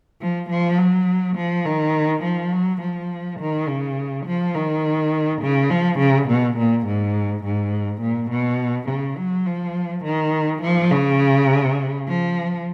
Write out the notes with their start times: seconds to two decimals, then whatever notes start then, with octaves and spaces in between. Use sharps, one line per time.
0.21 F3
0.50 F3
0.78 F#3
1.36 F3
1.65 D#3
2.23 F3
2.52 F#3
2.81 F3
3.39 D#3
3.68 C#3
4.26 F3
4.55 D#3
5.41 C#3
5.70 F3
5.99 C#3
6.29 B2
6.57 A#2
6.87 G#2
7.44 G#2
8.01 A#2
8.30 B2
8.88 C#3
9.17 F#3
9.46 F3
10.04 D#3
10.62 F3
10.91 C#3
12.07 F3